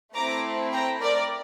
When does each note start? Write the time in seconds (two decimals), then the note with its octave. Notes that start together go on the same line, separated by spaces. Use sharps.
0.14 A3 C4 E4 A#5 D6
0.72 G5 A#5
1.02 A#4 D5